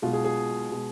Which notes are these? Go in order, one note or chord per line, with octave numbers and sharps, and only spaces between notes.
B1 B2 G#3 F4
G#4
G#4
B2 G#3